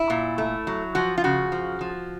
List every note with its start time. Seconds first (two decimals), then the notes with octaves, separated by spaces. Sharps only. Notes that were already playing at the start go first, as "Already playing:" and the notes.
Already playing: E4
0.10 A#2
0.38 A3
0.67 F#3
0.95 F3 F#4
1.18 F4
1.24 C#3 F#4
1.52 F3
1.81 F3